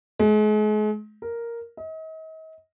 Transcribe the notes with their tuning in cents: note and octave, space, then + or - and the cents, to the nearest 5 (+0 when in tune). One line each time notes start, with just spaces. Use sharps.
G#3 +40
A#4 +0
D#5 +40